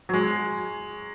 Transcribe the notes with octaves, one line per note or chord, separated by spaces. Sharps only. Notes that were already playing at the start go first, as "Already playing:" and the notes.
F#3
G#3